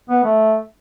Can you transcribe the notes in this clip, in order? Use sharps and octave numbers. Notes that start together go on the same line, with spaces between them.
B3
A3